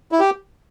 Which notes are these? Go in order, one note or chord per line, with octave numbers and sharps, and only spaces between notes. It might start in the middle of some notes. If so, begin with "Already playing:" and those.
E4
G4